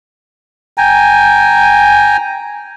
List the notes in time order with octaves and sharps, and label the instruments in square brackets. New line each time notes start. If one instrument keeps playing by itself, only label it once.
[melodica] G5 G#5 A#5